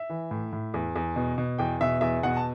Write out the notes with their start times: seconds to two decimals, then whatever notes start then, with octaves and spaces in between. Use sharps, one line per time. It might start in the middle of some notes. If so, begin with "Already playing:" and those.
Already playing: E5
0.10 E3
0.31 A2
0.53 A2
0.74 E2
0.96 E2
1.16 B2
1.38 B2
1.58 E2 G5
1.81 B2 E5
2.01 E2 E5
2.23 B2 F#5
2.37 A5